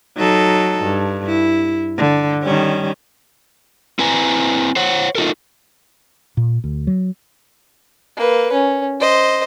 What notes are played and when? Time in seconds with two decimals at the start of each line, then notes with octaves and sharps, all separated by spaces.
0.17 F#3 D#4 A4
0.83 G2
1.27 E4
1.98 D3
2.44 D#3 G3 C#4
3.99 C4 E4 B4 G#5 A#5
4.76 C5 C#5 F#5
5.15 D#4 F4 F#4 A4 A#4
6.37 A#2
6.64 D2
6.87 F#3
8.17 A#3 B4
8.52 C#4
9.00 C5 D#5